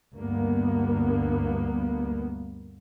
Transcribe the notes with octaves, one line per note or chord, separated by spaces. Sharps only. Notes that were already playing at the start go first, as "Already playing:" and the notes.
D2 G2 A#3 B3